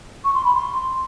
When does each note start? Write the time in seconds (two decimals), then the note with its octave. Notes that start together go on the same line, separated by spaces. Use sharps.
0.25 C#6
0.35 C6
0.45 B5
0.55 C6